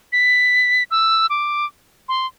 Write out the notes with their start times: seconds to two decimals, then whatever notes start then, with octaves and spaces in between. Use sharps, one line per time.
0.12 B6
0.91 E6
1.30 D6
2.08 C6